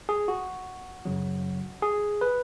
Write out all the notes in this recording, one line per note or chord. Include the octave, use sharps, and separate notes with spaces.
G#4
F#4
F#2 C#3 F#3
G#4
B4